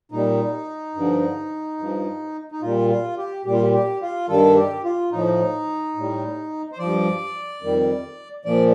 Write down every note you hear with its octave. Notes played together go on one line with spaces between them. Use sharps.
A#2 G3 D#4
G2 D3 F3
G2 F3
D#4
A#2 G3 F4
F4
G4
A#2 G3 G4
F4
G4
G4
F4
G2 D#3 G3 A4
G4
F4
A2 F3 D#4
A2 G3
C5
G2 F3 D5
F2 D#3 G3
A#2 F3 D5